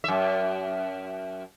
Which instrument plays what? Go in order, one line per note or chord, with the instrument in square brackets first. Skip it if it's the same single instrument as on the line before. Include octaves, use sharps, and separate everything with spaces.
[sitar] F#2 E5